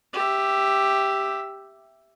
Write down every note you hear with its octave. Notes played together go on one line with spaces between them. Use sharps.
G4 E5